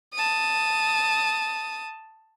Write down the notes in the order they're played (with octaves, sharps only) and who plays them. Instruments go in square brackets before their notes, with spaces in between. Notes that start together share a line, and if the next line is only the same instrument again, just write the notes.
[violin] A5 D#6